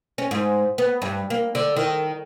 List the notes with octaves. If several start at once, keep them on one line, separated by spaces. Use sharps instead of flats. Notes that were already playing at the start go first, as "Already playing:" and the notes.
C#4
G#2
B3
G2
A#3
D3
D#3